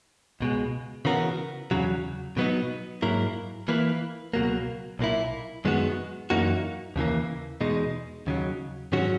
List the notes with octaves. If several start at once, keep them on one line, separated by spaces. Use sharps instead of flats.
C#2 B2 G#3
C#3 E3 B3 F#4 A#4
E2 C#3 F#3
B2 F#3 B3 D#4
G#2 F#3 A#3 E4 A#4
E3 A#3 E4 B4
C#2 B2 F#3 A#3
B1 A#2 A#3 E4
F#2 D#3 G#3 B3 F#4
F#2 E3 A#3 D#4 F#4
D#2 C#3 E3 A#3
E2 B2 G#3 D#4
D#2 C#3 F#3
G#2 D#3 F#3 C#4 F#4